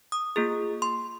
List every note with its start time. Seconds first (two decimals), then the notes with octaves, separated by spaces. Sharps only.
0.12 D#6
0.36 A#3 F4 G#4
0.82 C6